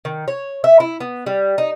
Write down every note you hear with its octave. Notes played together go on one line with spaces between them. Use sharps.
D#3
C#5
E5
E4
B3
G3
D#4